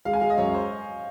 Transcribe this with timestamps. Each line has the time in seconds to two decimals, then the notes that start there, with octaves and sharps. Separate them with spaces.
0.05 G#3 F5
0.13 G#5
0.21 G#3 F5
0.30 D#5
0.38 F#2 C#5
0.54 C5